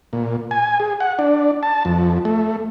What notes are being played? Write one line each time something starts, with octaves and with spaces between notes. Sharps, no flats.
A#2
G#5
G#4
F#5
D4
A5
F2
A3